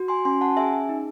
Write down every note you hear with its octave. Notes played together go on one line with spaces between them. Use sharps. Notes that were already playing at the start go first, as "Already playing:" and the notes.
Already playing: F#4
G#5 C6
C#4 G#5 C6
F#5 A5
G#4 E5 G#5
D#4